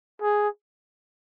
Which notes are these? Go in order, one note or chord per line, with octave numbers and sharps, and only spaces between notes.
G#4